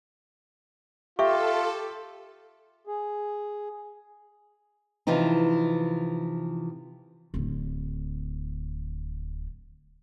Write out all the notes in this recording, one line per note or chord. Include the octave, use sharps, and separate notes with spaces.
F4 G4 A4 E5 C#6
G#4
C3 E3 F3 C4 D#4
D1 D3